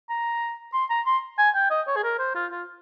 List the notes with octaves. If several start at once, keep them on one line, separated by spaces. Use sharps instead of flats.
A#5
C6
A#5
C6
G#5
G5
D#5
C#5
G#4
A#4
C5
F4
F4